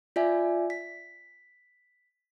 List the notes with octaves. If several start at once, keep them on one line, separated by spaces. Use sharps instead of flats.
F4 D5 E5 G#5
B6